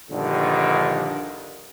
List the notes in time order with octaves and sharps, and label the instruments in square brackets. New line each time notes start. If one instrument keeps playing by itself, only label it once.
[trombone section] A#1 G2 D3 D#3